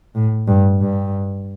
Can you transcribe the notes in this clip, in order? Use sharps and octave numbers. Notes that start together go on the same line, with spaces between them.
A2
G2
G2